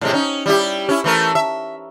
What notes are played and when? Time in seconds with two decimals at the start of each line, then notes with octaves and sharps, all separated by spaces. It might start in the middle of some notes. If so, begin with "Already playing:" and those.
0.01 A2 C3 G#3
0.13 C#4 D#4
0.46 G3 E4 G4
0.89 C#4 E4
1.04 E3 A3 A#4
1.35 E5